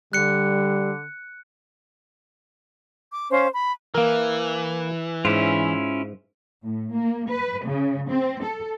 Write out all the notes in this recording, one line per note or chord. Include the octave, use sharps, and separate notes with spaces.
D3 G3 F#6 C#7
D6
C#4 C5 F5
B5
E3 A#3 A#4
G#2 C#4 E4 F4
A2
A#3
B4
C#3
C4
A4